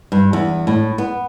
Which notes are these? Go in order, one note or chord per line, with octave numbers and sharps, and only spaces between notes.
G2
E2
A2
B3